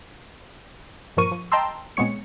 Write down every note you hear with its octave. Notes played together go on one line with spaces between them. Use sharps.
G2 A#2 F3 A#4 C#6 D#7
F3
D#5 G5 A5 A#5 C6 E6
A#2 G#3 B3 C4 C#5 C#7